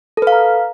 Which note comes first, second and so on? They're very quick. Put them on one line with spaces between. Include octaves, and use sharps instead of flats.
A4 B4 F5 A#5